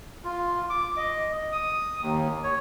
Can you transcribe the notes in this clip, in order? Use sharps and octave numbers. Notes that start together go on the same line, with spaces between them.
F4
D6
D#5
D#6
D#2
C#5